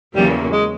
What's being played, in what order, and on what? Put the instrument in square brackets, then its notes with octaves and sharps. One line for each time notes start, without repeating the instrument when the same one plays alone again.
[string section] E2 C#3 F#3 A#3 [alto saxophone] G3
[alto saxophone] G#3